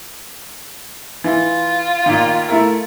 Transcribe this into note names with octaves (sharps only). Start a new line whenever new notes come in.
E3 F4
A#2 D#3
A3 E4 A#4